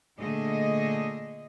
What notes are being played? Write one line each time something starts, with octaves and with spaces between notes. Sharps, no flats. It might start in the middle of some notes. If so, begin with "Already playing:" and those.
A#2 D3 A3 G#4 D#5